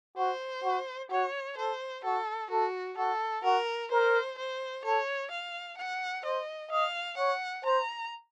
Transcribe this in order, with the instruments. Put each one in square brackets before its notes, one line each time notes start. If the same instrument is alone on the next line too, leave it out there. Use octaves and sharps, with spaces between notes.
[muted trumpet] F#4 [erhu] C5
[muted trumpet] F#4
[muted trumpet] F#4 [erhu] C#5
[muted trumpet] A4 [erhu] C5
[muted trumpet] F#4 [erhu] A4
[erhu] F#4 [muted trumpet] A4
[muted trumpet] F#4 [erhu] A4
[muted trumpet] F#4 [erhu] A#4
[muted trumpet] A#4 [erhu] C5
[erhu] C5
[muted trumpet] A4 [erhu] C#5
[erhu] F5
F#5
[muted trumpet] C5 [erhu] D#5
[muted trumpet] D#5 [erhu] F5
[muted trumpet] C#5 [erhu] F#5
[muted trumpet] C5 [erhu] A#5